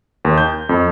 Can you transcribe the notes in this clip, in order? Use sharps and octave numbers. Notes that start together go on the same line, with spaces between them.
D#2
G6
F2